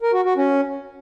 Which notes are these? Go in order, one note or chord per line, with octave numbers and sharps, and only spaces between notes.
A#4
F#4
F#4
C#4